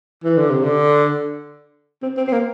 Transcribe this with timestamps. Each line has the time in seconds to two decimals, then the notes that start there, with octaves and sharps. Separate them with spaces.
0.24 E3
0.37 D3
0.51 C3
0.64 D3
2.03 C4
2.17 C4
2.27 C4
2.33 A#3